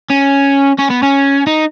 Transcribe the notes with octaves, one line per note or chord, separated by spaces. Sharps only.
C#4
C#4
B3
C#4
D#4